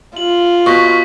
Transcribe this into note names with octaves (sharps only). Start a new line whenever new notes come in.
F4 F#7
B2 C#6 B6